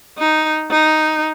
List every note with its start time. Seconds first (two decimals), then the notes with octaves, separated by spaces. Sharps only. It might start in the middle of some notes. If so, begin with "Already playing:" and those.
0.18 D#4
0.71 D#4